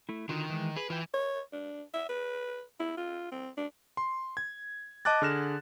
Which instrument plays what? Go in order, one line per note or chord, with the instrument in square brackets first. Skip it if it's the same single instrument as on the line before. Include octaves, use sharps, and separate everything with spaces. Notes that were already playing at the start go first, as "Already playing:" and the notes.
[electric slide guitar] A3 E4
[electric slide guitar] D3 F4 F#4 [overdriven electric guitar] D#3
[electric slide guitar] E3 G#3
[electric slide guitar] G#4 [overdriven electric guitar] B4
[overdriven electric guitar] E3 [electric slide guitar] F4 B4 G5
[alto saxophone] C#5
D4
E5
B4
E4
F4
C4
D4
[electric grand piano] C6
G#6
D#5 A5 D6 F#6 A6
D3 G#4 F6 A#6 E7